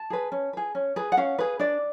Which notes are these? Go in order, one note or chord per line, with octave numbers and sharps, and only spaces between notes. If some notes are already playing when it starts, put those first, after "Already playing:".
Already playing: A5
G#4 B4
C#4
G#4 B4
C#4
G#4 B4
F#5
C#4 F5
G#4 B4
D4 D5